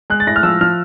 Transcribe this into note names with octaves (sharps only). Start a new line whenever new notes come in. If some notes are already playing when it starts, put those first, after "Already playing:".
G#3 F#6
A6
A2 A#6
F6
F3 E6
F3 F6